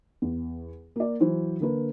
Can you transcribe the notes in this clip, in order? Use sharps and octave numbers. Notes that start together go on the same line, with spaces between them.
E2
A#3 D5
E3 F#3 C5
D3 A#3 B4